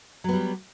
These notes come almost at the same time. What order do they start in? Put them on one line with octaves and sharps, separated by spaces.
F#3 B3 G3